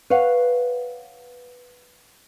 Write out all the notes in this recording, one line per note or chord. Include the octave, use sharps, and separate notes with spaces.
B4 C#5 F5 F#5